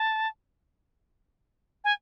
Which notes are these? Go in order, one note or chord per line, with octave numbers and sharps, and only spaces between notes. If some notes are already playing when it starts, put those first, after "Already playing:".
Already playing: A5
G#5